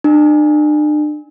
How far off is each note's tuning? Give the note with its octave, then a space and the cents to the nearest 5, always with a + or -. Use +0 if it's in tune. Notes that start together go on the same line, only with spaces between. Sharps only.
D4 +40